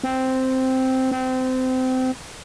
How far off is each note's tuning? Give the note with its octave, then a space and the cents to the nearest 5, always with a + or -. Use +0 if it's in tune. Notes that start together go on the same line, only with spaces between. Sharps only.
C4 -5
C4 -25